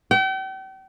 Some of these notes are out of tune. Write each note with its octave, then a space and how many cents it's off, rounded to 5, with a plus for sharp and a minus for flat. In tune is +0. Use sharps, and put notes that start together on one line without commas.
G5 -40